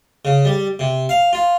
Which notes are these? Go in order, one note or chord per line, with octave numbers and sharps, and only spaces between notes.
C#3
G3
C3
F5
F4